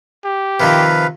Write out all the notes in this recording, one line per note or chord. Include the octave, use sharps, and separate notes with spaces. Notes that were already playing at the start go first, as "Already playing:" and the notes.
G4
C3 D#3 F3 B4 F5